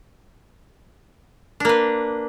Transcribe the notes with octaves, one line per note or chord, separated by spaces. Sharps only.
A#3 D4 B4